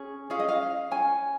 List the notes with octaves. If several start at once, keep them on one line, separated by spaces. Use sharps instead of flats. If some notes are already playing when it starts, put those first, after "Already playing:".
Already playing: C#4 G#4
C#4 G#4 F5
D#5
F5
C#4 G#5